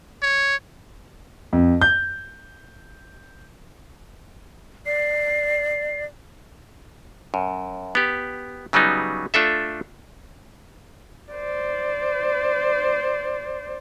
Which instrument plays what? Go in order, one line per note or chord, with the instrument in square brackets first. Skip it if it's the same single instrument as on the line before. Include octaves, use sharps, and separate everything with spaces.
[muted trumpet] C#5
[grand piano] F2
G6
[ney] D5 [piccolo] C7
[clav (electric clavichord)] F#2
B3 G4
C#3 F#3 G3 B3 D#4
A3 D4 F4 A4 E5
[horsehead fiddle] C5 D5